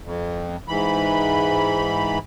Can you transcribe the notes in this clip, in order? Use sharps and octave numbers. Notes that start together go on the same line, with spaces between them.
F2
G#2 E3 B5